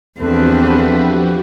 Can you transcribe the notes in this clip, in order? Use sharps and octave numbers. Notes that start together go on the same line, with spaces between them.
E2 F3 C4 D4 F#4 G4 A4 B4